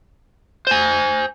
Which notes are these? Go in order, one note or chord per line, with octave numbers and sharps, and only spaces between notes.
C5 G#5